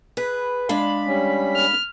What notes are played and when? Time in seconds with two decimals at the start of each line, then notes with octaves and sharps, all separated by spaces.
0.17 G#4 B4
0.69 G#3 D4 F5 B5
1.06 G3 C#4
1.56 F6